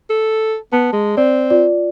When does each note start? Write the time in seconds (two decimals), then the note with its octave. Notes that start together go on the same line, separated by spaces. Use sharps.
0.10 A4
0.73 B3 A5
0.92 G#3
1.17 C4 D5
1.50 F4 D5